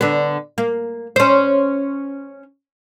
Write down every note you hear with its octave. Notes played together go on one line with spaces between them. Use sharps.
D3 B3
A#3
C#4 C5